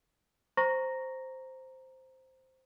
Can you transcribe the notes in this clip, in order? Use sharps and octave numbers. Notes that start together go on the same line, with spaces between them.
C5 A#5 C#6 A#6